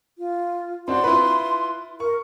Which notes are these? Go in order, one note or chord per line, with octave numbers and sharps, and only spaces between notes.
F4
C4 D4 F#4 C6
E4 F4 B4
A#4 C#6